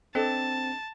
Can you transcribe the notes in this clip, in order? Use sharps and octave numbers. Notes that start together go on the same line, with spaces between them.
C4 D4 A4 D#5 A5